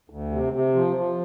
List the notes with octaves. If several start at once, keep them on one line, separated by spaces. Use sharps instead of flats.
D2
C3
C3
F3
F3